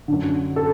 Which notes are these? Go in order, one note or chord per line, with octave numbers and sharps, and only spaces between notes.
F#2 D3
A4